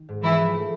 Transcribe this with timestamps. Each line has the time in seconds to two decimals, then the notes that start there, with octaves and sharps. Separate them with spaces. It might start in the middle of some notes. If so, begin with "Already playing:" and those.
Already playing: D#3
0.09 G#2
0.23 E3 F3 E4
0.39 F3
0.53 A3